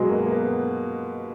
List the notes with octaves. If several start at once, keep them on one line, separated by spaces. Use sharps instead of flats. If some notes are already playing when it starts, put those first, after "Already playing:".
Already playing: B2 F#3 G#3
A#3
A#3
B3